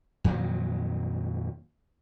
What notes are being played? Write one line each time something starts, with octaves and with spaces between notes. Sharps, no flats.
F2 A#2 D#3 F#3